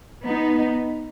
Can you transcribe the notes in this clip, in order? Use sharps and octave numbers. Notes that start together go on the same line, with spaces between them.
B3 D#4